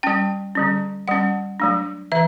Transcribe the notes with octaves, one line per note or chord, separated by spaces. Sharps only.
G3 C#4 G5
D3 G3 C#4
G3 C#4 F#5
F#3 A3 D4
E3 E5